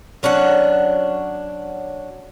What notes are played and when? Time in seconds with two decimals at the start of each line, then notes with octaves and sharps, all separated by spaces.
0.23 F#3 C#4 D4 F#5